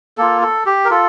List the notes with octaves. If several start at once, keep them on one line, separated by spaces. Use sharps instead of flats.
A#3 F4 A4
A4
G4
A#4
F4 A4